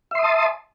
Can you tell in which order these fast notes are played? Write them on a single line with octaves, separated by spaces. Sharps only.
E5 C6 D#6 A5